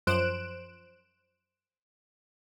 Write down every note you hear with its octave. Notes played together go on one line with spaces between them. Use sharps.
F#2 F3 C5 F#6 D7 E7